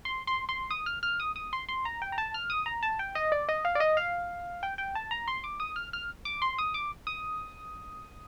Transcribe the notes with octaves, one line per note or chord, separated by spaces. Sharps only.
C6
C6
C6
D#6
F6
F6
D#6
D#6
C6
C6
A#5
G5
A#5
A5
F6
D#6
A#5
A5
G5
D#5
D5
D#5
F5
D5
D#5
F5
G5
G5
A5
A#5
C6
D6
D#6
F6
F6
D6
C6
D#6
D6
D#6